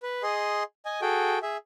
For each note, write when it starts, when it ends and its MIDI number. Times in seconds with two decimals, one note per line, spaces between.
0.03 0.23 71
0.23 0.63 68
0.23 0.63 75
0.23 0.63 84
0.85 1.01 75
0.85 1.01 80
1.02 1.39 66
1.02 1.39 68
1.02 1.39 69
1.02 1.39 79
1.42 1.57 68
1.42 1.57 76